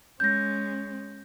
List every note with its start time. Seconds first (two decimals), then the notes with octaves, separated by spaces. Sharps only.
0.20 G#3 C#4 G6 A#6